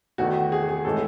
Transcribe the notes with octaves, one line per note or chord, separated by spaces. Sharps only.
E2 D#3 A3 F#4
G#4
G#4
A2 E3 G#3 A4